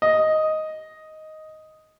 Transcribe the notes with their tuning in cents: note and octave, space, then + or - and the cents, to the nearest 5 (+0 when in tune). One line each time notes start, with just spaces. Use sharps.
D#5 +5